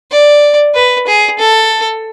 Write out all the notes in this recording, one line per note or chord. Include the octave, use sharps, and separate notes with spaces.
D5
B4
G#4
A4